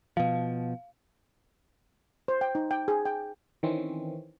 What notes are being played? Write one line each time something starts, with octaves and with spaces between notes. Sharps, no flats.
B2 F3 F5
C5
G5
D#4
G5
G#4
G5
D#3 E3 C4 C#4